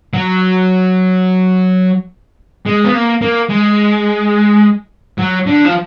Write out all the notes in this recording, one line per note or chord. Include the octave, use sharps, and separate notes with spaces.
F#3
G#3
B3
A#3
A#3
G#3
F#3
D3
F3